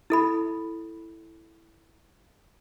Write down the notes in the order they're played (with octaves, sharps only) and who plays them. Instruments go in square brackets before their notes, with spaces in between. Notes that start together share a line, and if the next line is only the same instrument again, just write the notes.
[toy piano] E4 A4 B5